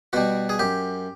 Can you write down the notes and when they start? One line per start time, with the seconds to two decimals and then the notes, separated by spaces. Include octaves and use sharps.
0.13 B2 G3 F#4
0.49 G#4
0.59 F#2 G4